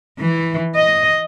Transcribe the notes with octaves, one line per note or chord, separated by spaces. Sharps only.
E3
D#5